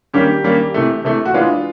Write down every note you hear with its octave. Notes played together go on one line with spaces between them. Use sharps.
D#3 G3 A#3 C#4 G4
D#3 G3 A#3 C#4
C3 E3 A3
C3 E3 A3
F#4
E3 G#3 B3 D4 F4